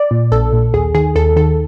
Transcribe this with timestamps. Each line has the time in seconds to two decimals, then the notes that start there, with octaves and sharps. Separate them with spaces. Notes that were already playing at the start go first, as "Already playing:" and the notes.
Already playing: D5
0.11 A#2
0.32 A#1 A4
0.53 A#2
0.73 D#2 G#4
0.95 D#3 G#4
1.15 D#2 A4
1.36 D#3 A4